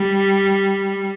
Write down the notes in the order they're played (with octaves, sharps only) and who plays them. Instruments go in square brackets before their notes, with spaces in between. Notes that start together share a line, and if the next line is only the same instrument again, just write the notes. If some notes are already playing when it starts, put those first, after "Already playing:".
Already playing: [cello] G3